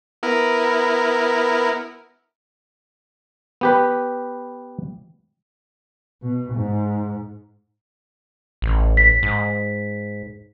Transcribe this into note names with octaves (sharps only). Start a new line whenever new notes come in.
B3 E4 A#4
B3 G4 B4
B2
G#2
A1
B6
G#2